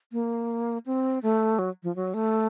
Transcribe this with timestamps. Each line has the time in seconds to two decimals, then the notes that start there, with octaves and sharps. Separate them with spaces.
0.12 A#3
0.86 C4
1.23 A3
1.59 F#3
1.83 F3
1.96 F#3
2.14 A3